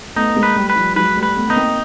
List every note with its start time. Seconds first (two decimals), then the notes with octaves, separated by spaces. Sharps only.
0.16 A3 B3 D#4
0.36 G#3 A#3
0.43 B4
0.56 G3 A3
0.70 B4
0.76 F3 G3
0.96 F#3 G#3 B4
1.16 G3 A3
1.23 B4
1.36 A3 B3
1.47 B3 D#4
1.56 A#3 C4